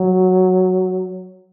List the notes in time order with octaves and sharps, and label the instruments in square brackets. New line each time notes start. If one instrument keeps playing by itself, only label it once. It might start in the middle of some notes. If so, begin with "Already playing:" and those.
Already playing: [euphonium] F#3